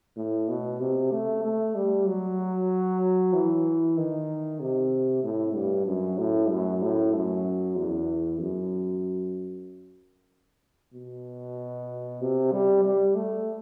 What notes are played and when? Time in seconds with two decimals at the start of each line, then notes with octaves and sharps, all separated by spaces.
0.16 A2
0.49 B2
0.80 C3
1.12 A3
1.44 A3
1.75 G3
2.07 F#3
3.33 E3
3.97 D#3
4.60 C3
5.23 A2
5.55 G2
5.87 F#2
6.18 A2
6.51 F#2
6.83 A2
7.14 F#2
7.77 E2
8.41 F#2
10.94 B2
12.21 C3
12.52 G3
12.85 G3
13.15 A3